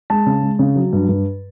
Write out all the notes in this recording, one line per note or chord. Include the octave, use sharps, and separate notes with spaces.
G#3 A5
C#3
G#3
C#3
F#3
G2
G2